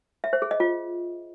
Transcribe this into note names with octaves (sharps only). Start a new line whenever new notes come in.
E5
C5
G#4
D#5
F4